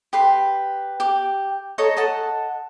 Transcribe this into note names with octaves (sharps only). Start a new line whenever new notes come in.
G4 B4 C6
G4 D6
A4 C#5 D#5 A#5
A4 D#5 F#5 A5